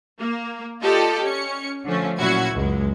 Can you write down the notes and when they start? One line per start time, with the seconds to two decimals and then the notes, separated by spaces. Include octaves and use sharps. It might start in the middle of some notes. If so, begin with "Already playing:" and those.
0.20 A#3
0.81 F4 G4 A4 D5 D#5 A5
1.22 C#4 C#7
1.84 D3 F3 A3 C#4
2.18 A#2 F#3 C#4 E4 F#4 G#6
2.53 C#2 F#2 G#3